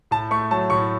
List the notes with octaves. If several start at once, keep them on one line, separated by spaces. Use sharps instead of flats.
A2 A5
A3 C#6
F#3 A5
A2 C#6